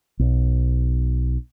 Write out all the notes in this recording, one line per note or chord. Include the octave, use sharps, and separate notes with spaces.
B1